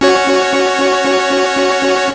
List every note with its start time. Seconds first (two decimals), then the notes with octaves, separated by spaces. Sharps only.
0.01 C#4 F#4 C#5